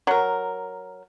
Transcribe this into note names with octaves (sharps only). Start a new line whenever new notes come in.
F#3 A#4